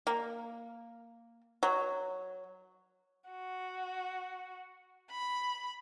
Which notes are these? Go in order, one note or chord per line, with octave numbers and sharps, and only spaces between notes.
A#3
F#3
F#4
B5